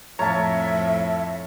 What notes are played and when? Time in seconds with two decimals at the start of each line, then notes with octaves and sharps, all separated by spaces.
0.19 F2 A2 C#5 E5 F5 A5 A#5